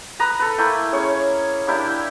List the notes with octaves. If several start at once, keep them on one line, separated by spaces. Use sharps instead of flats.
B4 A#5 D#6
A4 B4
A3 A#3 E4 G5
C#4 G#4 C#5
A#3 D4 E4 G4
G5